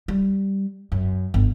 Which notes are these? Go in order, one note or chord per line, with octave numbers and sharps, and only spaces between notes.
G3
F#2
G1